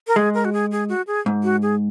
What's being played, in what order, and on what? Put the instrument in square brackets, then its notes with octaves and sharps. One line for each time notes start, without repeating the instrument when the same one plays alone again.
[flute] A#4
[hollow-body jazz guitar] G#3 [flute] G#4
[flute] A#4
F#4
G#4
G#4
F#4
G#4
[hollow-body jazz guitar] G#2
[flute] F#4
G#4